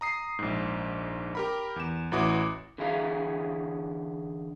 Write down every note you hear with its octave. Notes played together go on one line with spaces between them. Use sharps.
A#5 D#6 C7
A#1 G#2
G4 A#4 B5
E2 E7
A1 E3 E4 F#4 D6 D#6
D3 E3 E4 G#4 E5 F5